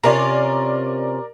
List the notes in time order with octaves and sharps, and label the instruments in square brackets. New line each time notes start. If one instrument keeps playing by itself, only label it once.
[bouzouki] C3 C#4 F4 [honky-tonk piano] A#4 D5